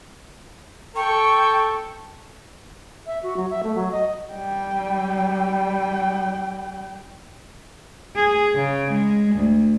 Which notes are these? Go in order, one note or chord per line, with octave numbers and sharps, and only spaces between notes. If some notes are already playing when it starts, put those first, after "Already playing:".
A4 G5 C#6
E5
F#4
F#3
E5
A3
F#3
D#5
G3 G5
G#4
C#3
G#3
D2